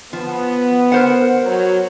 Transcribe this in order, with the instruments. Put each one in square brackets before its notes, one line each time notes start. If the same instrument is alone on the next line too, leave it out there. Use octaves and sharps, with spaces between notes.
[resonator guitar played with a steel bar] F3 [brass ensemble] B3
[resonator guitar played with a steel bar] A#4 C5 F#5
[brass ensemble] F#3